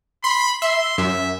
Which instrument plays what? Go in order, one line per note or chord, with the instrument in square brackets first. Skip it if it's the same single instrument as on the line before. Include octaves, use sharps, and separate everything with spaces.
[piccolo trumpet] B5 [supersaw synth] C6
[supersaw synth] E5 [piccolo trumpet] C6
[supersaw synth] F#2 [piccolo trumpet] E5